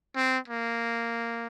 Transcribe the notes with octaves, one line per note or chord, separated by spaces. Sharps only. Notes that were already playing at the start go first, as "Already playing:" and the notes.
C4
A#3